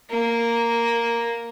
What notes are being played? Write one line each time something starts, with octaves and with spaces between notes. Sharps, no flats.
A#3